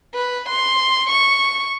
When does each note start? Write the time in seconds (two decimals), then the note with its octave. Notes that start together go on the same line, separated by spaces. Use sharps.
0.14 B4
0.49 C6
1.10 C#6